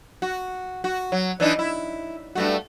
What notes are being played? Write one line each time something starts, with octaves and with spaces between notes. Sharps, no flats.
F#4
F#4
F#3
E3 D4 D#4
E4
G2 A3 F#4